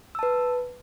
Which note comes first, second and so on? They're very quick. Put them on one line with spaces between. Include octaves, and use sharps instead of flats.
E6 A5 B4